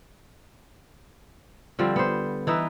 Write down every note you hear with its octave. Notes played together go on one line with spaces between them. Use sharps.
D3 F3 G3 C4
B3 C5
E3 D#4 B4 E5